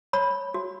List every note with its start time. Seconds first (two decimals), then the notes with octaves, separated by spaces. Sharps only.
0.13 C#5 B5
0.54 F#4